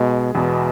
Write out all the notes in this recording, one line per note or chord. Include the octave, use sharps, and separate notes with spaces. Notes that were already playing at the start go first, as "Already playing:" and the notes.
Already playing: B2 G#3
E2 B2